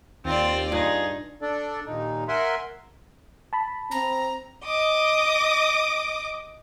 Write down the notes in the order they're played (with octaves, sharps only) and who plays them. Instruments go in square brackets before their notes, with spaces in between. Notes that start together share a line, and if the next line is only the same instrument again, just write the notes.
[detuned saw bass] D#2 [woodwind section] C4 [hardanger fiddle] F4 D5
[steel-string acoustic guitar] G2 [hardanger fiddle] D#4 [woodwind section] F4 G#4
[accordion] D4 A4 D5
D#2 A#2 D#4
A#4 E5 F#5 G#5 C6
[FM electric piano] A5 B5
[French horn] C4 [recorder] A#5
[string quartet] D#5 D6 D#6